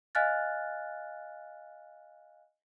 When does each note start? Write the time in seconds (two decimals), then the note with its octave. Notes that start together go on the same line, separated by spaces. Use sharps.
0.15 D#5 F5 G#5 F6 F#6 A6